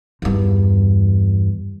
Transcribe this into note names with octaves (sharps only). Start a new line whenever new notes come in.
E2 G2